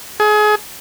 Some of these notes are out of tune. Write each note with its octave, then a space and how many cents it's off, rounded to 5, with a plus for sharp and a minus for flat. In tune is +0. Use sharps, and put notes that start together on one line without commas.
G#4 +30